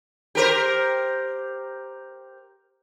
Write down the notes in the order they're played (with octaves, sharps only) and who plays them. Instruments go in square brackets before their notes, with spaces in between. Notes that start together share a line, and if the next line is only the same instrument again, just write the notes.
[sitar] G4 A#4 C5